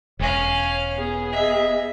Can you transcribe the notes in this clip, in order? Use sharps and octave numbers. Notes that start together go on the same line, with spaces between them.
E1 C#4 C#5 F5
B3 G#4
D#5 E5